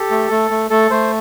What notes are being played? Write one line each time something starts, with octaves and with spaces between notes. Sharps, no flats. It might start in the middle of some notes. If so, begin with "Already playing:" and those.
Already playing: G4 A4
A3
A3
A3
A3 A4
A3 C5